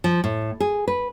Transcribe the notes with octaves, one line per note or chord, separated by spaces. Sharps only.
F3
A2
G#4
B4